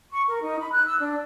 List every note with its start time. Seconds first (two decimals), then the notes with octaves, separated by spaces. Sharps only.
0.10 C#6
0.29 A#4
0.42 D#4
0.59 B5
0.71 F#6
0.86 E6
0.99 D4